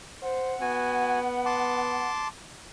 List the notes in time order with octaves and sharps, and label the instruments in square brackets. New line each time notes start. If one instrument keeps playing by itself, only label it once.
[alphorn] C5 [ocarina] F#5
[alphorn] B3 [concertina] F#4 G#5
[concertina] A5 C6 D6